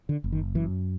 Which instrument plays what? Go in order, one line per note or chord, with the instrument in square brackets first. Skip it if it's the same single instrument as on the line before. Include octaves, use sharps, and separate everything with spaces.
[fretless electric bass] D3
F#1
D#3
F#2 E3